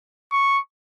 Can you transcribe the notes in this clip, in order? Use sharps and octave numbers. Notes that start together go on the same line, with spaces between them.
C#6